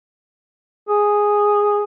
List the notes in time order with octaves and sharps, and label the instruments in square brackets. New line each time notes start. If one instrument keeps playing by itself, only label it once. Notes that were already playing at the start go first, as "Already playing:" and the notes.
[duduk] G#4